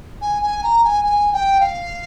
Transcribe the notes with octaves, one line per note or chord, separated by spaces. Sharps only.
G#5
G#5
A#5
G#5
G#5
G5
F5